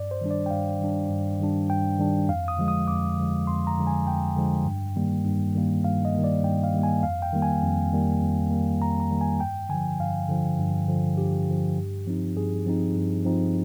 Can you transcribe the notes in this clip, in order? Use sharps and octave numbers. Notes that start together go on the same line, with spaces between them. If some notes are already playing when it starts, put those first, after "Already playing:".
Already playing: G2 D5
C5
D#3 G3 D4
D5
G5
G2 F5
D#3 G3 D4
G2
D#3 G3 D4
G2 G5
D#3 G3 D4
F2 F5
D#6
D3 F3 G#3
D#6
F2 D6
D3 F3 G#3
F2 C6
A#5
D3 F3 G#3
G#5
F2 G5
D3 F3 G#3
G2
D#3 G3 A#3
G2
D#3 G3 A#3
G2 F5
D#5
D#3 G3 A#3
D5
G2 G5
F5
D#3 G3 A#3
G#5
F2 F5
G5
D#3 G3 A#3
G#5
F2
D#3 G3 A#3
F2
D#3 G3 A#3
F2 A#5
A#5
D#3 G3 A#3
G#5
G2 G5
D3 F3 G#5
G2 F5
D3 F3
G2
D3 F3
G2 G4
D3 F3
G2
F3 C4 D#4
G2 G#4
F3 C4 D#4
G2
F3 C4 D#4